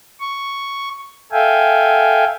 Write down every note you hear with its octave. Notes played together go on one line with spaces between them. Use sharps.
C#6
A4 E5 F5 G5 G#5